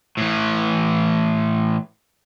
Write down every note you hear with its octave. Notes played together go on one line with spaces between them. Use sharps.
A2 E3